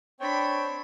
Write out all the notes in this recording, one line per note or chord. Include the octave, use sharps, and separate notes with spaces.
C4 D4 C#5 G5 B5